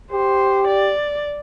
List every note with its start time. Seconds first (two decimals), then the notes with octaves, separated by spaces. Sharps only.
0.12 G4 C5
0.68 D5